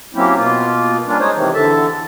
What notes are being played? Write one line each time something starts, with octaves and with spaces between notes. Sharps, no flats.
F#3 A#3 C4 C#4 E4 G4
B2 A#3 F4
G3 A#3 C#4 D4 F4
G#3 D#4 C5 C#5
C3 D#3 E3
E2 D3 A4 E5 A5